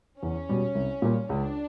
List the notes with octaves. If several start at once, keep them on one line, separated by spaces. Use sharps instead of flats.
E2 C#4
B2 G3
C2
A#2 G3 A#3
C#2 D4